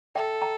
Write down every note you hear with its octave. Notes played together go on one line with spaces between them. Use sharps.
A4 E5 G5
G5 A#5